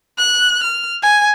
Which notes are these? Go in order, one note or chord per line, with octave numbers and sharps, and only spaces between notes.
F#6
F6
G#5